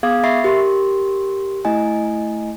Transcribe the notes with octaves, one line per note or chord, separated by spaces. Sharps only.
B3 G#4 F5 D6 D#6 G#6
E5 B5 C#6 A6 C7
G4 A#4 C6
A3 E4 D#5 G#5